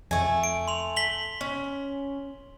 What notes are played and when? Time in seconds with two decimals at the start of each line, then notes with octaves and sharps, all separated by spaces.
0.11 F2 A3 G#5
0.44 D7
0.68 C6 F7
0.96 B6 F#7 G7
1.41 C#4